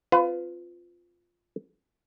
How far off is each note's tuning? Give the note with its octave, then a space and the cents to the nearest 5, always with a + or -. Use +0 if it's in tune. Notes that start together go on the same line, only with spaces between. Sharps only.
C4 +0 F4 +0 B4 +30